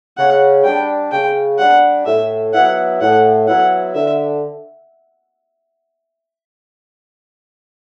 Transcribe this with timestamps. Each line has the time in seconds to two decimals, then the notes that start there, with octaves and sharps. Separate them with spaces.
0.18 C#3 F#5
0.64 G3 D4 G5
1.11 C#3 G5
1.59 G3 D4 F#5
2.06 A2 E5
2.53 F#3 B3 E4 F#5
3.01 A2 F#5
3.47 F#3 B3 E4 F#5
3.95 D3 E5